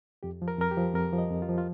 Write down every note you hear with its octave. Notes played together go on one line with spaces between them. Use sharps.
F2 G4
F3
A#4
F2 A#4
G4
F3
F2 A#4
F3
D#5
F2
F4
F3
F4